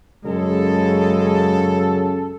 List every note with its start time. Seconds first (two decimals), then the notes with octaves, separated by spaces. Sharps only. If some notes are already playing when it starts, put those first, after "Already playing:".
0.25 F#2 C#3 G#3 A4